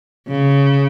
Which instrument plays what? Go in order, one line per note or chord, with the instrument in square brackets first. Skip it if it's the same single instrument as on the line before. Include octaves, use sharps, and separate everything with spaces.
[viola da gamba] C#3